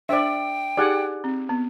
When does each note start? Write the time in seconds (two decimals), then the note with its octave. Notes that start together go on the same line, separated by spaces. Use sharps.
0.09 D4 C5 D5 E5 G5
0.77 D#4 G4 G#4 D5 F#5 G#5
1.24 C4
1.49 B3